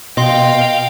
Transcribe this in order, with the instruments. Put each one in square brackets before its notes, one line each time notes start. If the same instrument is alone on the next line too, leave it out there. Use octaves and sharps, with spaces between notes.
[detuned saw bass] B2 [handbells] D#5 C6 [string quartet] F5 G5